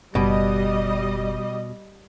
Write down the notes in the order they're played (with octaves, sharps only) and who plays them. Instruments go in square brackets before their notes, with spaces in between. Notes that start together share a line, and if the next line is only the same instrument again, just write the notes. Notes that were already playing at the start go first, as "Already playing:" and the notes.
[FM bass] F#1 [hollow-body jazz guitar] B2 [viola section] G3 D#5